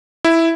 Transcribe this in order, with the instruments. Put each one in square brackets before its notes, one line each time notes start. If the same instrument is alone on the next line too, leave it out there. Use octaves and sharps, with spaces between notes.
[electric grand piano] E4